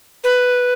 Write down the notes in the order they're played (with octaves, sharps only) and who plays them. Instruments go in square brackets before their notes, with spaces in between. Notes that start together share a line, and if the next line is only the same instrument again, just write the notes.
[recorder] B4